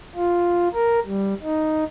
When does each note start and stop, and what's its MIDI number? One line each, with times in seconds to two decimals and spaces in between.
0.16 0.68 65
0.74 0.99 70
1.05 1.34 55
1.43 1.84 63